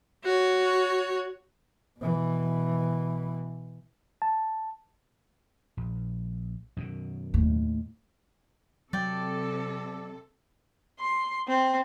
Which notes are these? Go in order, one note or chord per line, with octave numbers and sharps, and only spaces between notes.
F#4 C#5
B2 E3
A5
A#1
F#2 B2 D#3
D#2 A2
C3 F#3 A4 D5 G5
C6
C4